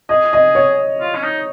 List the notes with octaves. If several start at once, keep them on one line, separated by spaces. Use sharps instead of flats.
G#4 D#5
D#5
C#5
F4
C#4
D#4